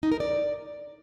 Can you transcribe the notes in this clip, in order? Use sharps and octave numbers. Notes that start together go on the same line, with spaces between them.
D#4
A#4
D5